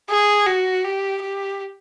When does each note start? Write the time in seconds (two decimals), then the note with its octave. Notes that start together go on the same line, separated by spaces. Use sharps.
0.10 G#4
0.47 F#4
0.84 G4
1.22 G4